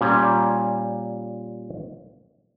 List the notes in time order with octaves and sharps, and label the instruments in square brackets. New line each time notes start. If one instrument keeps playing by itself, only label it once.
[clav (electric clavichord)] A#2 G3 C#4